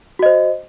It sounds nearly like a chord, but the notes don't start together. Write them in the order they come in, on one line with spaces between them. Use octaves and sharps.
F#4 D#5 C5